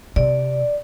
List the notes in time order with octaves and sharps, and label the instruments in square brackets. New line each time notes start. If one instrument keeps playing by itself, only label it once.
[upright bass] C3 [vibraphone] D5